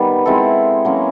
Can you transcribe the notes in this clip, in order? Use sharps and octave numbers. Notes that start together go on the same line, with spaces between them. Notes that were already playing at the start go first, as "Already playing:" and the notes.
Already playing: D#3 G3 B3
G#3 C4 E4 A4
F#3 A#3 C#4